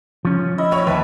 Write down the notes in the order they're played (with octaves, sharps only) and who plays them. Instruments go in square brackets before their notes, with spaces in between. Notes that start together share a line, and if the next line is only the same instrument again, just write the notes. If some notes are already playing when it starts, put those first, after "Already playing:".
[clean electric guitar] F3 C#4
[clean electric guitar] E4 [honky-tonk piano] D#5
[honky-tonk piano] A#1 C#5 F7
[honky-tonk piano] D#2 E5 [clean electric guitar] B4 A5